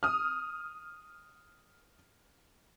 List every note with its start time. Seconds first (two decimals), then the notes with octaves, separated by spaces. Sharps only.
0.03 D#6 F6